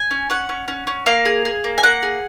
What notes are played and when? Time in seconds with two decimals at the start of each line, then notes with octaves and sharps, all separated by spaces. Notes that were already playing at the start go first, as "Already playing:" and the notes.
Already playing: G#5
0.11 C#4
0.30 C#4 F#5
0.49 C#4
0.68 C#4
0.87 C#4
1.06 A#3 F5
1.25 G#4
1.45 G#4
1.64 A#3
1.78 G#5
1.83 A#3 F#5
2.03 G#4